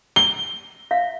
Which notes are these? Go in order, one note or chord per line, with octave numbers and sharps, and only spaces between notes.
G7
E5 F5